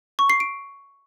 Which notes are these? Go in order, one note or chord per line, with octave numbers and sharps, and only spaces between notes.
C#6
C7
D7